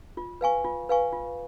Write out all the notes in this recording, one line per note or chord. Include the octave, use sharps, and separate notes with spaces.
F4
B4 F5 G#5 C#6
F4
B4 F5 G#5 C#6
F4